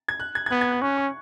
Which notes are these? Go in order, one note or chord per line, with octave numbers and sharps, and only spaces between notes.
G#6
F#6
G#6
G#6
B3 F#6
G#6
F#6
C#4 C#6
C#6